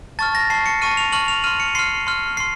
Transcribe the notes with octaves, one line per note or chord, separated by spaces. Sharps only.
A5 C#6 F6 A6
A#6
A5 C#6 F6 C7
C#7
A5 C#6 F6 D#7
F7
A5 C#6 F6 F#7
F7
C6 F6 D#7
C#7
C6 F6 C7
C6 F6
C6 F6 C7